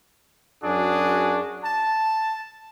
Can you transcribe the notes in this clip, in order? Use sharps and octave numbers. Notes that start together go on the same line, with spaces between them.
F#2 D4 F#4 G#4
A5